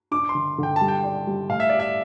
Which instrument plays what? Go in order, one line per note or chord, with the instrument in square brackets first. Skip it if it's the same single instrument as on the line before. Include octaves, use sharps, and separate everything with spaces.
[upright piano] D4 [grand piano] D6
[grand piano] C6
[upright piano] D3
[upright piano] D3 [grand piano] G5
[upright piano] G3 [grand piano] A5
[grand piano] G5
[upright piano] D5
G3
[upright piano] A2 [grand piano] F5
[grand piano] E5
[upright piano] G4 [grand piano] D5
[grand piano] E5